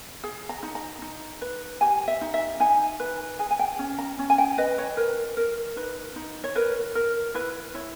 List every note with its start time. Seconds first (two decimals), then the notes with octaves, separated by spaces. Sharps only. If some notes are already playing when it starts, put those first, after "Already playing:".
0.24 G#4
0.49 A#5
0.63 D#4
0.75 A#5
1.02 D#4
1.41 B4
1.81 G4 G#5
2.08 E5
2.21 D#4
2.34 E5
2.60 D#4 G#5
3.00 B4
3.39 G#4 G#5
3.51 G#5
3.59 G5
3.79 C#4
3.99 A#5
4.19 C#4
4.30 G#5
4.38 G5
4.58 B4 D#5
4.78 C#5
4.97 A#4 B4
5.37 A#4
5.76 D#4 B4
6.16 D#4
6.44 C#5
6.55 A#4 B4
6.95 A#4
7.34 E4 B4
7.74 E4 C#5